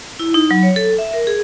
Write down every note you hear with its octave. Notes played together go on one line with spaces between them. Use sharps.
E4
D#4
F#3
C#5
A4
E5
A#4
G#4